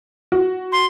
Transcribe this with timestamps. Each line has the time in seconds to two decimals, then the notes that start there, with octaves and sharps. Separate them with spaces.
0.32 F#4
0.72 C6